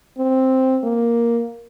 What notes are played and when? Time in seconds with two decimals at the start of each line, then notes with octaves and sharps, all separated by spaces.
0.18 C4
0.84 A#3